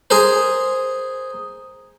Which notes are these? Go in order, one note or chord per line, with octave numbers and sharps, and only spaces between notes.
G#4 A#4 C5